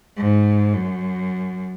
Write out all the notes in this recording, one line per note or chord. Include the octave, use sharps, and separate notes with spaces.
G#2
F#2